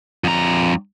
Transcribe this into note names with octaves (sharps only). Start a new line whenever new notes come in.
F2 A#5